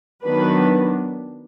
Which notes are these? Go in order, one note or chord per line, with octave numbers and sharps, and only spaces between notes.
D#3 F#3 B3 D4 B4